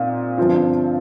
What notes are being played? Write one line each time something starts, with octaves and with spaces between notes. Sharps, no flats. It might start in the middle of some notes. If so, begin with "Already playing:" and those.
Already playing: A#2 C4 D#4
G1 G2 F3 C4 F4